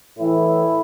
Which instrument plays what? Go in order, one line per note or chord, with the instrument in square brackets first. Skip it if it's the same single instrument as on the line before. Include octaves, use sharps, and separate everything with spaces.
[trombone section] A2 E3 E4